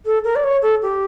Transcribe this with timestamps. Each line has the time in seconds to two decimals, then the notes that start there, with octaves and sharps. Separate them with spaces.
0.05 A4
0.24 A#4
0.35 D5
0.43 C#5
0.62 A4
0.82 G4